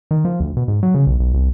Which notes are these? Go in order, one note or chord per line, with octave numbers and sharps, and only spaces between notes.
D#3
F3
D2
B2
G#2
F#3
C#3
B1
B1
C2